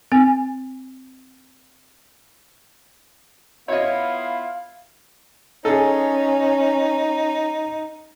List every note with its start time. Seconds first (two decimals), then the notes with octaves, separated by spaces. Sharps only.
0.12 C4 G#5
3.68 B3 E4 F4 C#5 D#5 F5
5.65 C#4 D#4 G#4 A4